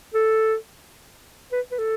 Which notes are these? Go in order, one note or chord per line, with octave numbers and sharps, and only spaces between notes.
A4
B4
B4
A4